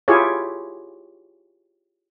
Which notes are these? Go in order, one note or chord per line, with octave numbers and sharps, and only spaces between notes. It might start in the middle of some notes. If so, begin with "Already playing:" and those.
E4 F4 G4 G#4 C#5